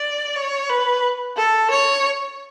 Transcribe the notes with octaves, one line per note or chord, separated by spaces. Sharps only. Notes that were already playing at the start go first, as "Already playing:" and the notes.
Already playing: D5
C#5
B4
A4
C#5